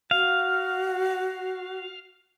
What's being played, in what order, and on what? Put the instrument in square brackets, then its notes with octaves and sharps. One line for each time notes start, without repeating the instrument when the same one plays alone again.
[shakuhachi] F#4 [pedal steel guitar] F5